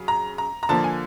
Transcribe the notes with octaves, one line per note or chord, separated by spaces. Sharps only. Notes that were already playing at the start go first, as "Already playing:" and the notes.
Already playing: C#3 F#3
A#5
A#5
A#5
D3 F3 A#3 A5
G#5